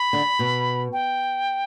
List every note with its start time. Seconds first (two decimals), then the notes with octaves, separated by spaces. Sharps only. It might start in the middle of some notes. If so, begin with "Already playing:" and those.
Already playing: B5
0.13 D3
0.39 B2
0.93 G5